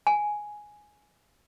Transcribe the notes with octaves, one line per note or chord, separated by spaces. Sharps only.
G#5